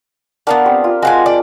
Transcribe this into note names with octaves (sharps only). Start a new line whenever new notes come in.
B3 D4 A#4 F5 F#5
C4 G4
F4
G#3 F#4 F5 G5 G#5 C6
D5